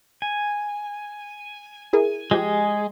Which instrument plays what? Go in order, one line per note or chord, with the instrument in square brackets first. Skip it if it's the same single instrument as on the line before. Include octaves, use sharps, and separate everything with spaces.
[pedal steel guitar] G#5
[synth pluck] E4 G#4 A#4
[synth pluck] F3 G4 [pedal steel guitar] G#3 G#4